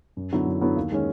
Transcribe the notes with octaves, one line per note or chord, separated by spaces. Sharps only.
F#2
D3 F#3 B3 E4
F#2
D3 F#3 B3 E4
D#2
D#3 G#3 C#4